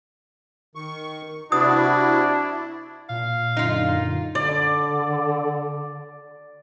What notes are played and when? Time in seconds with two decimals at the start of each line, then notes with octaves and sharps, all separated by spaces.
0.75 D#3 C#6
1.52 C3 D4 E4 F#4 D#6
2.25 E4
3.09 A#2 F5
3.57 F#2 D3 D#4 F4
4.35 D3 D5